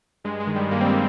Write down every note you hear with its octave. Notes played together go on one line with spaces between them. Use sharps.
G2 G#3
G#3
D#3
G3
G2 G3 A#3
C4
G3 A#3